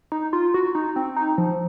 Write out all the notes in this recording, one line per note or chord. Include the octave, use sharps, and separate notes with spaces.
D#4
F4
F#4
D#4
C4
D#4
F3